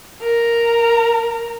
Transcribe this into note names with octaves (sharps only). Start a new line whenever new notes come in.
A#4 A#5